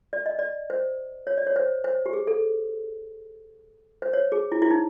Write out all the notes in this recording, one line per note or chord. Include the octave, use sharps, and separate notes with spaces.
D5
D#5
D5
C5
C#5
D5
C#5
C5
C5
G4
G#4
A4
C5
C#5
G#4
E4
E4
D#4